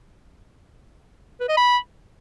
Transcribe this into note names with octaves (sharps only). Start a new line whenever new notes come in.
B4
D#5
B5